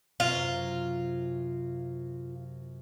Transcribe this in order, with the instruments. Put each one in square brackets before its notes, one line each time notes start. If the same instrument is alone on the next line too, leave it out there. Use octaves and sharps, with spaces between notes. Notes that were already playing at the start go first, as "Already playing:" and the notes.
[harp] F#2 C3 C#4 [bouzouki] F4